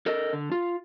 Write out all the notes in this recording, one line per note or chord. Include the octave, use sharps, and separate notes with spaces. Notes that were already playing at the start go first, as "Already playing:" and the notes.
A4 A#4 D#5
D3
F4